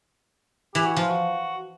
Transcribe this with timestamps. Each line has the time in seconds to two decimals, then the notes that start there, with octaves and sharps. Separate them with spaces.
0.75 E3 G4
0.86 F#4
0.96 F3 F4
1.09 F#4